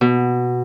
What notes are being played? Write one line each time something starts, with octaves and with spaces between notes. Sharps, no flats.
B2